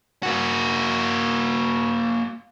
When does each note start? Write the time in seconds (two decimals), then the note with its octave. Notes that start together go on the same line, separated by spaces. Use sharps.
0.23 A#3 F#4